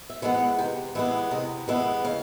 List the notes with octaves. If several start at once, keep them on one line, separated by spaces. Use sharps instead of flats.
E5
E3 G#3 B3
F#5
C3 G5
E3 G#3 B3 E5
C3 D#5
E3 G#3 B3 E5
C#3 F5